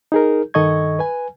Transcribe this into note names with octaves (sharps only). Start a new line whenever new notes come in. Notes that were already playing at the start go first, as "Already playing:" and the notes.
D#4 G#4 A#4
G2 D#3 A4 D#5 C#6 G#6
B4 G#5